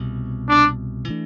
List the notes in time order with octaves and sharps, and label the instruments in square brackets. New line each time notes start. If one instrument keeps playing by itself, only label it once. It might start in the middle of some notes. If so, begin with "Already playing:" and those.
Already playing: [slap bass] C2 B2 B3
[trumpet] D4
[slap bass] E3 A3 D4